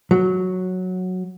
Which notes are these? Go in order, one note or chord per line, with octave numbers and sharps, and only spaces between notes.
F#3